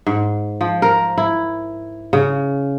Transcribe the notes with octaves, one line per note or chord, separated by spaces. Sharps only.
G#2
F3
A#4
E4
C#3